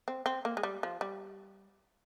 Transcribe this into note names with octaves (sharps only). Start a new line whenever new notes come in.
C4
C4
A#3
G#3
G3
F3
G3